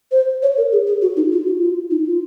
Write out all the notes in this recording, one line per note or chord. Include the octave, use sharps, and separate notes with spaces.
C5
C#5
A#4
G#4
G#4
F#4
D#4
F4
F#4
F4
D#4
F4